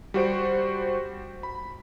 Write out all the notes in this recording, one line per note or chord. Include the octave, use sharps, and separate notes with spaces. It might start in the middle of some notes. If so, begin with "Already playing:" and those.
G3 F#4 C5 D7
B5